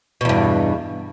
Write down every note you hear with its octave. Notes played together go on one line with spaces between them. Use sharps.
E2 G2 B2